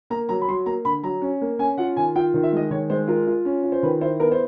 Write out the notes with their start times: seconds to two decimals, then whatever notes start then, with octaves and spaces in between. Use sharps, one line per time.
0.10 A#3 A#5
0.29 F#3 A#5
0.41 B5
0.48 F#3 C6
0.66 A#3 A#5
0.85 D3 B5
1.03 F#3 A#5
1.22 C#4
1.41 A#3
1.59 C#4 G#5
1.78 F4 F#5
1.96 D#3 G#5
2.15 F4 G5
2.34 D#3
2.43 E5
2.53 G#3 D#5
2.71 D#3 C#5
2.90 G#3 C5
3.08 F4 A#4
3.27 F4
3.45 C#4
3.63 F4
3.72 C5
3.83 D#3 B4
4.01 E4 C5
4.20 B3 A#4
4.31 C5